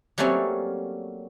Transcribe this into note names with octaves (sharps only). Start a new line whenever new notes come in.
F#3 G3 A3 A#3 C4 C#4